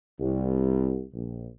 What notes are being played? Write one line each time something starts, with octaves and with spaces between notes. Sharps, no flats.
C2
A#1